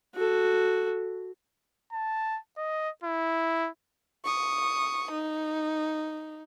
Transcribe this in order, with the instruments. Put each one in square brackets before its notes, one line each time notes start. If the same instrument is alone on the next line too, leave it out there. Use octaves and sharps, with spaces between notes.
[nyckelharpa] F#4 A4
[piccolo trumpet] A5
D#5
E4
[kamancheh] C#6 D#6
D#4